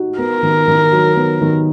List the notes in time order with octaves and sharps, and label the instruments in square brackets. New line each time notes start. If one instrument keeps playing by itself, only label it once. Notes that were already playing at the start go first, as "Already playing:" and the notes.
Already playing: [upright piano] D#4 F#4
[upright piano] B3 [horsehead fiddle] A#4
[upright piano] D#3
D#3
F#3
B3
D#3